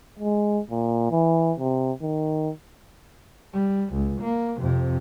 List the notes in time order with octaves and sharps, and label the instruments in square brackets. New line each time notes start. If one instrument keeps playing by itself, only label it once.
[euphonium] G#3
A#2
E3
C3
D#3
[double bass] G3
C#2
A#3
F2 C3